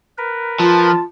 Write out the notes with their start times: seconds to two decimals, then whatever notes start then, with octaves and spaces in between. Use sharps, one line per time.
0.18 A#4 B4
0.60 F3 F4 A5